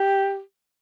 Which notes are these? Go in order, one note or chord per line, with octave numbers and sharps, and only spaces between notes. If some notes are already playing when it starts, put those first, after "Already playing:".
Already playing: G4